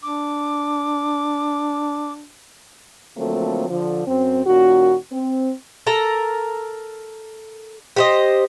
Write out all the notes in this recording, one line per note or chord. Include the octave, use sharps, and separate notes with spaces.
D4 D6
D3 F3 F#3 A3 A#3 C4
D3 F3
F#2 C4
A#2 D#3 C#4 F#4
C4
A4 A#4 A#5
G4 C5 D#5